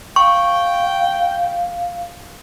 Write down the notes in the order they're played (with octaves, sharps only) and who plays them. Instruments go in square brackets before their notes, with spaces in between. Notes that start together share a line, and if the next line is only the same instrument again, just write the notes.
[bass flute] F5 [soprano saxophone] G5 [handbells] C#6